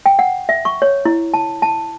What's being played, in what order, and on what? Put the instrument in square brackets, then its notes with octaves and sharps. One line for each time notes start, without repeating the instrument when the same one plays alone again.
[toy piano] G5
F#5
E5
C#6
C#5
E4
A5
A5